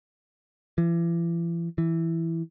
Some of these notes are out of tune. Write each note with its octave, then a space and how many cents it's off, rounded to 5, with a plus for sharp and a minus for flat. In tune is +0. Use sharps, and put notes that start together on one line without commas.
E3 +40
E3 +0